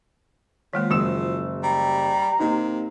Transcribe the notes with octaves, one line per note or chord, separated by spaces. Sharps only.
D#3 F3 G#3 A#3
F#1 F#3 F4 E6 E7
G3 A#5
C3 A#3 D#4